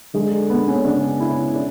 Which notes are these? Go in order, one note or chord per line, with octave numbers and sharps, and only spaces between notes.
D3 G#3
B3
C#4
C#3 D4
E4
D4